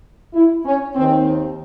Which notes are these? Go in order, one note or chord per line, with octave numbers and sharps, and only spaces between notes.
E4
C#4
D#2 D#3 C4